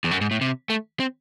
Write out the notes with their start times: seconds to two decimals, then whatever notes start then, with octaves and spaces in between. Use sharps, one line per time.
0.04 E2
0.11 F#2
0.21 G#2
0.31 A2
0.41 C3
0.70 A3
1.00 C4